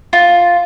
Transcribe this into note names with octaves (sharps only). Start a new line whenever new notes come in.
F4